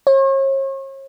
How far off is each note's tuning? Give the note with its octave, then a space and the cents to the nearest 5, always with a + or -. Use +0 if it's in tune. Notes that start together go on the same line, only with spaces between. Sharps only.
C#5 -40